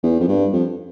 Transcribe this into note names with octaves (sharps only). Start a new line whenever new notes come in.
E2
F2
G2
F2